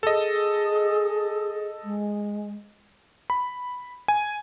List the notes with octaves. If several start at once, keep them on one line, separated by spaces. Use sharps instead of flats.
G#4 A4 D#5
G#3
B5
G#5